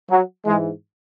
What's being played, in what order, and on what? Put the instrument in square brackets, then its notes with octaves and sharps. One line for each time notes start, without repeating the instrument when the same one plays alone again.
[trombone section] F#3
G#2 E3 G#3